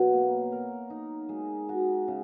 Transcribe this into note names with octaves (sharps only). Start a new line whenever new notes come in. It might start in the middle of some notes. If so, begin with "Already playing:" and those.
Already playing: B2 F#3
A#3
A#4
D#4
G#3
F#4
C#3